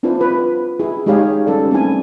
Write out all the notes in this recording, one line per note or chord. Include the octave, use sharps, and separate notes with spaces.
C4 D4 E4 F4 B4 C5
F4 B4
E4 G#4
G#3 D#4 G4 G#4 C#5 F5
G3 C#4 A4 B4 D5
A3 C4 D4 E4 G#5